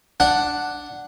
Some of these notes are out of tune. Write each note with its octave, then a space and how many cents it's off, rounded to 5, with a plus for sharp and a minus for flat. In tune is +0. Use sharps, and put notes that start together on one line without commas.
D4 +0 F#5 +0